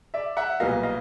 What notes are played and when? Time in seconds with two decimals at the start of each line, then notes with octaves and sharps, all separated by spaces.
0.14 D5 E5
0.37 E5 F#5
0.60 B1 A#2 G3 B3 D#5 F5
0.83 D#5 F5